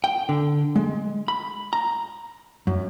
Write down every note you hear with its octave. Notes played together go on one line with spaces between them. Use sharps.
G5
D3
G#3
B5
A#5
F#2